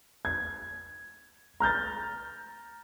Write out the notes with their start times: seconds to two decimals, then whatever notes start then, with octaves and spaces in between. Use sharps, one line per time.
0.25 G#6
1.60 A#5 F6 G6 A6